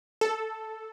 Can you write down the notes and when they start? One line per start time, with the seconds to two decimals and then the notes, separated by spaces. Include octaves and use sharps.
0.21 A4